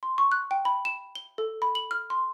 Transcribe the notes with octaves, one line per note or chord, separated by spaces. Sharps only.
C6
C#6
F#6
G5
B5
E7
G7
A4
B5
F#7
F6
C6